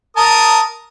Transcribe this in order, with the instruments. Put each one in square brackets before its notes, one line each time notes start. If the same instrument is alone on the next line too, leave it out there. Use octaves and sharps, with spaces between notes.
[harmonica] A#4 A5 D#6